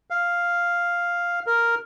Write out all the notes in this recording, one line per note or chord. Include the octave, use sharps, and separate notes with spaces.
F5
A#4